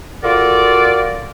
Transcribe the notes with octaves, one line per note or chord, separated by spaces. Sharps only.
F4 F#4 A4 A#4 D5